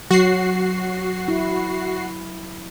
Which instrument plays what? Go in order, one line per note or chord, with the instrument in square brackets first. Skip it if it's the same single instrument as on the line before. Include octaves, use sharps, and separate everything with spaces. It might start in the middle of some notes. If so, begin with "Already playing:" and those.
[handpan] F#3 [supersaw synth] F#4 C7
[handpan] E4